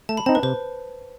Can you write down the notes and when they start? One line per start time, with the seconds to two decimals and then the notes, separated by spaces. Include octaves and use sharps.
0.09 A3 A5
0.17 B5
0.26 C4 D#4 A5
0.35 B4
0.43 C3 C5